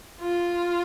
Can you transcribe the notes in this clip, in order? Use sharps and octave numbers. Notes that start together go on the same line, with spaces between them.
F4